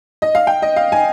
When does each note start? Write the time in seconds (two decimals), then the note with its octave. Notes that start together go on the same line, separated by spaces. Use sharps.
0.22 D#5
0.35 F5
0.47 G5
0.62 D#5
0.76 F5
0.92 G#5